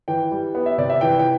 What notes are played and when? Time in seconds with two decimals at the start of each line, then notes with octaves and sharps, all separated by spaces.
0.08 E3 G5
0.32 G3
0.55 B3
0.66 E5
0.78 C3 D5
0.90 E5
1.01 E3 G5
1.19 G5